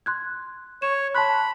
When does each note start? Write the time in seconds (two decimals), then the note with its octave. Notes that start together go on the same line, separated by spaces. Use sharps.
0.06 C6 F#6 G#6
0.82 C#5 E7
1.15 A5 B5 C6 F#6